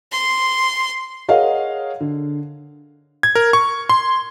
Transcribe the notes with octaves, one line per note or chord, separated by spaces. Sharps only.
C6
G#4 A#4 C#5 D#5 F5 F#5
D3
G#6
A#4
C#6
C6